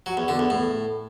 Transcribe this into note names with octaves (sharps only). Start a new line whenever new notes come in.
F#3
E2
D3
E2
A2